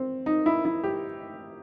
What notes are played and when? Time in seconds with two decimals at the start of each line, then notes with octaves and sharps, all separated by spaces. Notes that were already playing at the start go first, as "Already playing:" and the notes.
Already playing: C4
0.26 D#4
0.46 E4
0.65 E4
0.84 G4